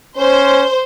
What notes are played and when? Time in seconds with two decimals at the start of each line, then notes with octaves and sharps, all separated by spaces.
0.18 C#4 C5